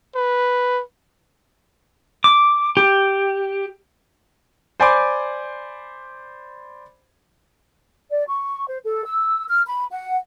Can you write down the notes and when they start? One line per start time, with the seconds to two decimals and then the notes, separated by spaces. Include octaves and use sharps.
0.15 B4
2.24 D6
2.77 G4
4.80 C5 D5 G#5 B5 C6 D6
8.10 D5
8.28 C#6
8.68 C5
8.85 A4
9.06 E6
9.50 F6
9.67 B5
9.91 F#5